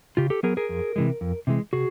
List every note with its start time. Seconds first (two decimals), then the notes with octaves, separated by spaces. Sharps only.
0.17 C#3 F4 G4
0.30 G4 A4
0.43 F#3 B3 G#4 A#4
0.57 G#4 A#4
0.69 F2
0.96 C3 E3 G#3
1.21 F2
1.47 C3 E3 G#3
1.73 C3 F#4 G#4